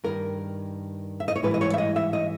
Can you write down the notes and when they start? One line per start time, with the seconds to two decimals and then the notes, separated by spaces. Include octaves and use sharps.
0.04 G2 D#3 G3 A#4
1.20 E5
1.28 D#5
1.36 C#5
1.43 G#2 E3 G3 B4
1.54 D#5
1.61 C#5
1.74 E5
1.78 D#5
1.96 E5
2.13 D#5